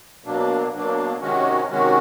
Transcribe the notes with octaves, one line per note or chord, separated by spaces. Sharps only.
B2 F#3 A#3 D4
B2 F#3 A#3 D4
C3 D#3 G#3 C#4 F#4
C3 D#3 G#3 C#4 F#4